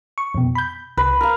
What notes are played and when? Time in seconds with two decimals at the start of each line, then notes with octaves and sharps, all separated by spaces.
0.18 C#6
0.34 F2 B2
0.55 B5 G6
0.97 C2 B4
1.21 A#4 F5